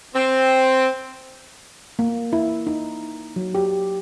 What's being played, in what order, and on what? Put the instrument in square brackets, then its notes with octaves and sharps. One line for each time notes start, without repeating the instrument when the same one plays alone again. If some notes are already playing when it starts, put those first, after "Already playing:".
[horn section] C4
[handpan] A#3
E4
D#4
F#3
G4